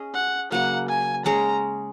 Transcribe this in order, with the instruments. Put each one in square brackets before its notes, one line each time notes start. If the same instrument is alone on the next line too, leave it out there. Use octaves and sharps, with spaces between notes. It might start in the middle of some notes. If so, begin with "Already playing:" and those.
Already playing: [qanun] C#4 G#4 D#5
[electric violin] F#5
[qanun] C#3 F#3 A#3 [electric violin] F#5
[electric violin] G#5
[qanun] G#3 C#4 G#4 C#5 [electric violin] A#5